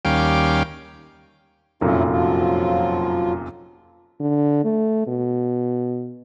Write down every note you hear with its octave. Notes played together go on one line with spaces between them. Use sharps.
D#2 G3 C#4 F5 G5 D6
F1 F#2 A#2 C#4 E4 F4
F3 F#3 F4
D3
A3
B2